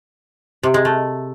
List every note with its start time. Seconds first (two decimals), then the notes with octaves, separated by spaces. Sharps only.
0.63 C3
0.74 G#3
0.85 A3